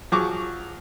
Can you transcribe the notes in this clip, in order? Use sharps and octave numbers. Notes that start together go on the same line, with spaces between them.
F3 F#3 G#4 C#6 D6